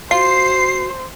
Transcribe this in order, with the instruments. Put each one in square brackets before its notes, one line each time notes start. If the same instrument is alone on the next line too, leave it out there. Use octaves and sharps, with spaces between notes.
[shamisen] F4 [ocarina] F#4 [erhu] C5 [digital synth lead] C7